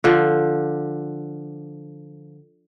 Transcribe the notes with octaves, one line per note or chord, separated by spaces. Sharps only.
D3 F3